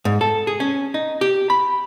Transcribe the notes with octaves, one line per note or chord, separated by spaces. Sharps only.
G#2
A4
G#4
C#4
D#4
G4
B5